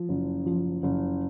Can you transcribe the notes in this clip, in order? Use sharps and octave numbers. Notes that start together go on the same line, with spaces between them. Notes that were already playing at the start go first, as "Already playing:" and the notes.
Already playing: F3
F#1
F3
F#1